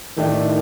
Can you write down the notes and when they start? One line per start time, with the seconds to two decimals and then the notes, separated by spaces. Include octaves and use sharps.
0.17 A2 D#3 A3 D4 G4